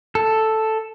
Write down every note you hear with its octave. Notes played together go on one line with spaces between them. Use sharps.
A4